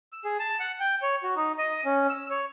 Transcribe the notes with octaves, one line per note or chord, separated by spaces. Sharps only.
E6
G#4
A5
F#5
G5
C#5
F#4
D#4
D#5
C#4
E6
C#5